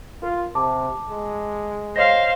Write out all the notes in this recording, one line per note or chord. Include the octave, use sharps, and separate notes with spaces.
F4 A#4
C3 A5 D6
G#3
C5 C#5 D#5 F5 A#6